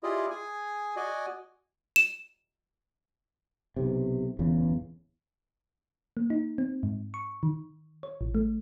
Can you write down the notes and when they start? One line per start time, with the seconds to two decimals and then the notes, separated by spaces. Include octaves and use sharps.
0.03 E4 F4 G4 G#4 D5 D#5
0.30 G#4 G#5
0.96 F#4 D5 D#5 G#5
1.96 E7
3.76 B1 C3
4.39 D1 E2 C#3
6.17 A#3
6.30 D#4
6.58 C4
6.83 G#2
7.14 C#6
7.43 D#3
8.03 C#5
8.21 A1
8.35 A3